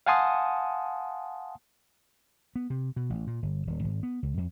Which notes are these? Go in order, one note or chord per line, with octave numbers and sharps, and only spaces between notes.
F5 F#5 G#5 A5 C6 D#6
B3
C3
B2
A1
A#2
G1
D#1
G#1
B3
C#2
F2